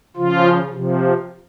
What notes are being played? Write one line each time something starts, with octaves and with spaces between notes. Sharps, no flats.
C#3 F3 F4
C3 F3